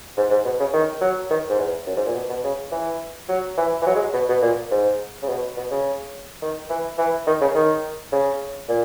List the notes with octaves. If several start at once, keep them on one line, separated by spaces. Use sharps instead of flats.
G#2
G#2
B2
C#3
D#3
F#3
D#3
G#2
E2
F#2
G#2
A#2
B2
B2
C#3
E3
F#3
E3
E3
F#3
G#3
B2
B2
A#2
G#2
C#3
B2
B2
C#3
D#3
E3
E3
D#3
C#3
D#3
C#3
A#2